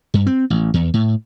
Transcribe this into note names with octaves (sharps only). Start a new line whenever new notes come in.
G2
C4
A1
E2
A2